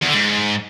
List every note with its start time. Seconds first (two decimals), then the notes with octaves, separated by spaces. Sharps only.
0.02 E2
0.08 D3
0.14 G#2